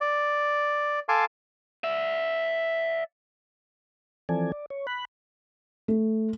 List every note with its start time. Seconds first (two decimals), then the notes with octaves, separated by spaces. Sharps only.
0.01 D5
1.09 A4 F5 G#5 A5 C6 D6
1.84 D5 E5
4.29 E3 F3 C4 A4 D5 G#5
4.52 D5
4.70 C#5
4.87 B5 F#6
5.88 A3